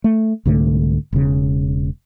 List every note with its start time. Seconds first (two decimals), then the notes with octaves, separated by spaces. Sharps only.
0.04 A3
0.45 C2 G#2 D3 A3
1.13 E1 C#3